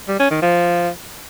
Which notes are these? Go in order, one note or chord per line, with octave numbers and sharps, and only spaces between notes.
G3
C#4
D#3
F3